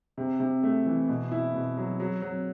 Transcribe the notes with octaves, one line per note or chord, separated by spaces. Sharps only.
C3
C3
A3
E3
B2
E4
B2
F#3
F#3
F#3